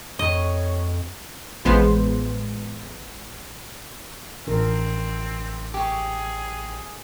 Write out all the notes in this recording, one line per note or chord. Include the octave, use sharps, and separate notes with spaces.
F2 C#5 D#5
A1 F3 G#3 B3 C5
A1 F3 C4 D4 A#4
G4 G#4 C#6